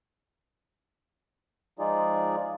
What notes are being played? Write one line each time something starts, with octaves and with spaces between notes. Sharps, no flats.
F3 G#3 D#4 F4 G#4 D5